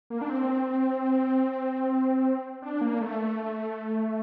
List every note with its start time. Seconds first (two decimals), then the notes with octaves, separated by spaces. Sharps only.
0.10 A#3
0.21 D4
0.29 C4
2.62 D4
2.81 A#3
3.01 A3